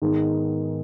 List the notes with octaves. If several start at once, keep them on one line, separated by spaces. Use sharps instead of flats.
G#2 D#3 G#3 B3 D#4